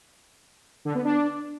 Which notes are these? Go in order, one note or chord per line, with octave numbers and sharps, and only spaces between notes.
D3
B3
D4